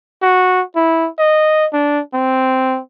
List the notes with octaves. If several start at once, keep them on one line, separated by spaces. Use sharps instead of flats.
F#4
E4
D#5
D4
C4